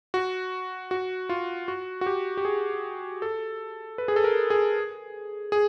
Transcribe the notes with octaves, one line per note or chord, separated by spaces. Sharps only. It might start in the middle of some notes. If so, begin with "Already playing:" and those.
F#4
F#4
F4
F#4
F#4
G4
G4
G#4
A4
B4
G#4
A4
A#4
G#4
G#4